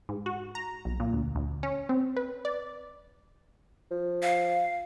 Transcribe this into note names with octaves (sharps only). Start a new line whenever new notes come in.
G#2
F#4
A#5
B1
A#2
D2
D2
C#4
C4
B4
D5
F3
F5